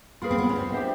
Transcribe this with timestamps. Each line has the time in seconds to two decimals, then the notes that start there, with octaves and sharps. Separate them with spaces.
0.22 A#3 F4 G#4 B4
0.31 C4
0.38 B3
0.49 C#4
0.56 C4
0.73 D4 G4 C5 E5